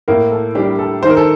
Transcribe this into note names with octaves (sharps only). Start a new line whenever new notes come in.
A2 A#3 A#4
A4
G3 D4 G4
A4
D#3 C5
A#4
A4